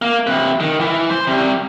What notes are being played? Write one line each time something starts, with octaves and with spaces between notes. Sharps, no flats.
A#3
C3 B4
D#3
E3
C5
C3 G3